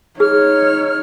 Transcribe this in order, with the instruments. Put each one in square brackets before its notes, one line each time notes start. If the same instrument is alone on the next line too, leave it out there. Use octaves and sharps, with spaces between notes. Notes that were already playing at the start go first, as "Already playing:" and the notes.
[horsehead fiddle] D#4 C#5 [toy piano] G#4 [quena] F6